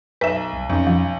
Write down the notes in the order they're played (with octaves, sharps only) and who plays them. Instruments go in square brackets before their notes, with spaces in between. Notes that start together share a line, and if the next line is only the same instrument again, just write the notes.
[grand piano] B1 [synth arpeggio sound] B4 E5
[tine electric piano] C2
[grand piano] B1 [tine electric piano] F2 C#4
[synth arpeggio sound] F3